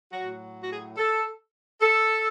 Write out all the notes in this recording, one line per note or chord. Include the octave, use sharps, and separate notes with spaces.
A2 F#3 F#4
F#4
G#4
A4
A4